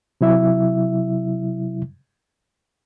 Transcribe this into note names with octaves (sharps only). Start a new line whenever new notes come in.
C3 F#3 E4 E5